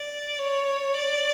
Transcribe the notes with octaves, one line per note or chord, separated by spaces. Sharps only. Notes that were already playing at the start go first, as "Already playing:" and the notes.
Already playing: D5
C#5
D5